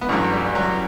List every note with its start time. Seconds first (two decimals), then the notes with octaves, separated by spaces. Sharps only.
0.01 B3
0.09 A1 G2 F#3 A3
0.32 G3
0.44 G3
0.55 F#3